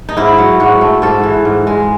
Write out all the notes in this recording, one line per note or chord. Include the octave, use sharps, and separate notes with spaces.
D#4
G#2 E4
F#3
G#2 F#4
A3
G#2 A4
E3
G#2
G#3